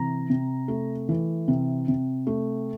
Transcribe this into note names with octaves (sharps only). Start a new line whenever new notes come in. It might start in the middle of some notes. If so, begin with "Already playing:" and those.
Already playing: C3 E3 A#5
C3
A3
E3
C3
C3
A3